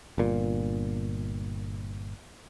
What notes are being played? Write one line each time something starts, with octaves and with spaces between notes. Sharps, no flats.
G1 A#2